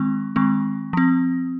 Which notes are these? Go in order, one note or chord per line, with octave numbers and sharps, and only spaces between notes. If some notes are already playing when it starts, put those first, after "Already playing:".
Already playing: D#3 G#3 C4
D#3 G#3 C4
F3 C4